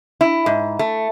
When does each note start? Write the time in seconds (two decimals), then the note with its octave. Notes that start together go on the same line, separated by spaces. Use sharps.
0.21 E4
0.46 G#2
0.79 A3